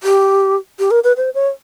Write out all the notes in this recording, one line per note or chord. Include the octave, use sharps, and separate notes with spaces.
G4
G4
A#4
B4
C5
C#5